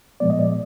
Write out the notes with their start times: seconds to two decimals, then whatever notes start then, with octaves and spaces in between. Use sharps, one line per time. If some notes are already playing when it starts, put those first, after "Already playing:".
0.20 A#2 F3 G#3 B3 D5
0.30 D#5
0.39 D5